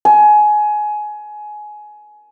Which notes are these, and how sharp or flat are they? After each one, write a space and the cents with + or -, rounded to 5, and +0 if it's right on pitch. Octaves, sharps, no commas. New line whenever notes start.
G#5 +20